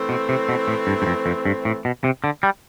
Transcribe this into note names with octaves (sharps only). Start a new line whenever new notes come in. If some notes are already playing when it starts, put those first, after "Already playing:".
Already playing: E3 A3 C4
B2
C3
B2
A2
G2
G2
F2
F2
G2
A2
B2
C3
D3
G3